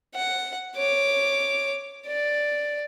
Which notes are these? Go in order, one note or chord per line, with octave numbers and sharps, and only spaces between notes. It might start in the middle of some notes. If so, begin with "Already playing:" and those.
F#5
C#5 D6
D5